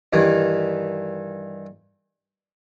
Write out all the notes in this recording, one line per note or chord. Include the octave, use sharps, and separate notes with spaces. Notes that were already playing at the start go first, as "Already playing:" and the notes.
G2 D#3 E3